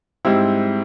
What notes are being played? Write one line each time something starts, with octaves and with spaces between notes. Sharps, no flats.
G#2 G3 C4 E4